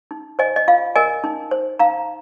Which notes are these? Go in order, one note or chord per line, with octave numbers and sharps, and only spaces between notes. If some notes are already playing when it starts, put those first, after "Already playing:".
D#4
C5 D#5 G#5
D#5
F4 F5
A#4 D#5 G#5
D#4
C5
D#4 F5 A#5